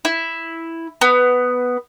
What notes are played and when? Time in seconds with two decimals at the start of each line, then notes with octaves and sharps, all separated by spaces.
0.05 E4
1.01 B3